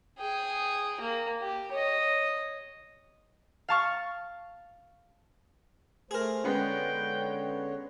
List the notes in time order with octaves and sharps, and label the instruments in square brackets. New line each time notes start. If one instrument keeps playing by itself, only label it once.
[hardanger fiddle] G#4 G5
A#3
G4
C#5 D#5
[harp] F5 A5 C#6 F6
[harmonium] A3 C5 [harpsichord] G#4 A#4
[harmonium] D3 C#5 [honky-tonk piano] G#3 B3 C#4 [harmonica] G5